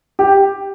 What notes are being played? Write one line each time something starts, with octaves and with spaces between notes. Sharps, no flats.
G4